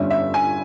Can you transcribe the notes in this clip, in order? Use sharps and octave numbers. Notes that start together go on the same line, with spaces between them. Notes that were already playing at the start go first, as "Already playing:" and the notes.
Already playing: G1 G2 G3 C#4 E5
E5
G#5